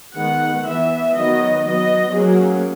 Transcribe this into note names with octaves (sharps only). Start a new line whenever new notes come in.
D#3 G#3 B3 F#5
E3 B3 E5
D#3 F#3 B3 D#5
F#3 B3 D#5
F#3 A#3 C#4 G#4